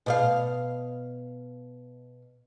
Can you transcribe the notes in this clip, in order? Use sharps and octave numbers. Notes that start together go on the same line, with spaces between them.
B2 D5 F5